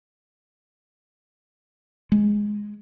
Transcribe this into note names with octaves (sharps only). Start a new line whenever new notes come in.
G#3